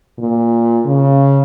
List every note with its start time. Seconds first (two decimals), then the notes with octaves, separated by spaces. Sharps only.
0.19 A#2
0.86 C#3